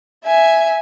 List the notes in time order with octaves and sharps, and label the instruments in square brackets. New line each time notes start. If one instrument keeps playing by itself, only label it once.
[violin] E5 G#5